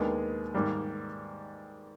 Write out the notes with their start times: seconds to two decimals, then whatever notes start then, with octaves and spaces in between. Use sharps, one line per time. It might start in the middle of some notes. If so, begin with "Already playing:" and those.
Already playing: D#2 D#3 G#3 B3 D4
0.54 G#2 D#3 G3 A#3